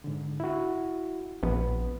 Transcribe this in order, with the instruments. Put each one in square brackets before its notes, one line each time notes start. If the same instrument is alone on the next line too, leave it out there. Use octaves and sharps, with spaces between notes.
[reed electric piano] G#2 D3
E4 F#4
[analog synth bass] A#1 [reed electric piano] B3